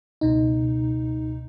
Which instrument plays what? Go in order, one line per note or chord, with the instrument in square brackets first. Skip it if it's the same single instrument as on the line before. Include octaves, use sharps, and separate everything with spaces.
[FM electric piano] C#2 B2 D#4